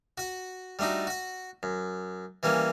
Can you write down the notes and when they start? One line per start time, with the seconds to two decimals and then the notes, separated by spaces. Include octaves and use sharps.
0.18 F#4 F#5
0.79 G3 A3 D4 D#4 F#4
1.07 F#4 F#5
1.63 F#2
2.43 E3 G3 A#3 C#4